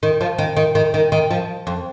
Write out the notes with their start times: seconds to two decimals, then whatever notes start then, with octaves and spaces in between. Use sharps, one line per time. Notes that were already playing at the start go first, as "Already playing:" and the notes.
0.03 D#3
0.21 F3
0.38 D#3
0.57 D#3
0.75 D#3
0.94 D#3
1.12 D#3
1.31 F3
1.67 F2